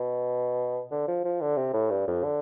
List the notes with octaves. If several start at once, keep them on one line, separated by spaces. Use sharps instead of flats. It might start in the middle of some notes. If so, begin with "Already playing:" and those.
Already playing: B2
D3
F3
F3
D3
C3
A2
G2
F2
D3